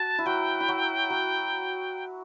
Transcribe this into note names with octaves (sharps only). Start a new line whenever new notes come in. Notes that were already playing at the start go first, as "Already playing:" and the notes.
Already playing: F#4 A5
E4
F#3 F#4 G5
E4
F#3 F#4
F#3 F#4